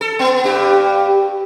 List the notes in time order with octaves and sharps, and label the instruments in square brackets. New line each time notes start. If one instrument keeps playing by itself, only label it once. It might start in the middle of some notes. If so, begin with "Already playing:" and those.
[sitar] A4
B3
G2 G4